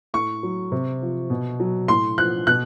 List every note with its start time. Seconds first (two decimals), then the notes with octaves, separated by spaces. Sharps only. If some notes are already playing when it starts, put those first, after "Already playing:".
0.14 A2 C#6
0.43 F#3
0.72 C3
1.02 F3
1.30 B2
1.60 F#3
1.88 A2 C6
2.18 F3 F#6
2.47 B2 F#6